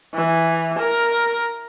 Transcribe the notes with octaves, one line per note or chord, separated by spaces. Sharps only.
E3
A#4